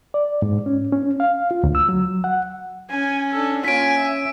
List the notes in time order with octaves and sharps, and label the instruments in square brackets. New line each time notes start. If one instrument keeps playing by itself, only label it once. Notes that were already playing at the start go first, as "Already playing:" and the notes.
[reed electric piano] D5
G#2
C#4
C#4
F5
F4
D2
E6
F#3
F#5
[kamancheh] C#4 [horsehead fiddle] G#5
[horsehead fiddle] D4 A4
[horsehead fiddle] A#3 F4 [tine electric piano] C#4 C#5 [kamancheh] G#5 [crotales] B6 D7
[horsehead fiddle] E5